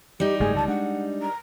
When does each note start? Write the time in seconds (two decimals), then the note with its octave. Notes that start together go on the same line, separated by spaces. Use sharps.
0.20 G3 D#4 G4
0.40 F#1 G#2 A3 G#4
0.56 C#2 D3 A5
0.68 G#3 D4 F#5
1.22 A#5